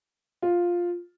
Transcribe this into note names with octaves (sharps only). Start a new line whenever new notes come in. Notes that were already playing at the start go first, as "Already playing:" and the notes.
F4